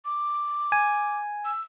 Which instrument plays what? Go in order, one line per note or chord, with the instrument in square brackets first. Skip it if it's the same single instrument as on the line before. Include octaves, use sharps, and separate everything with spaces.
[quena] D6
[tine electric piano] G#5
[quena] E6